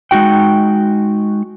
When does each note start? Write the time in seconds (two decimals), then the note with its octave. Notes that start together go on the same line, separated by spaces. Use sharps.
0.11 G#3 D#4 F#4 G5